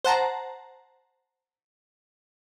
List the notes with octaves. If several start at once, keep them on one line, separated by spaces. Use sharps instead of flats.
C5 F#5 A5 A#5